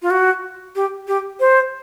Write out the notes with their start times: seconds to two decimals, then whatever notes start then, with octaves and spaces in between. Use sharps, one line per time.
0.02 F4
0.10 F#4
0.76 G4
1.08 G4
1.40 C5